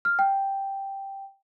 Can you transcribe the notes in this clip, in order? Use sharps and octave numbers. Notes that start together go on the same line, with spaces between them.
F6
G5